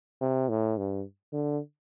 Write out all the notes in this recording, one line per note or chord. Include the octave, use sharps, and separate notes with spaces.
C3
A2
G2
D3